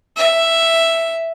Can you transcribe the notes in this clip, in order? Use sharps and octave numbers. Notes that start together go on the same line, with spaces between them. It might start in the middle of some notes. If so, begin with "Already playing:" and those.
E5